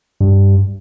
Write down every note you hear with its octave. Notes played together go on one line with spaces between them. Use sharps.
G2